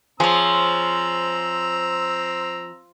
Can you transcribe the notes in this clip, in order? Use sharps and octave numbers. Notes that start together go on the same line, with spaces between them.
F3 C4 G#4 C#5 A#5 E6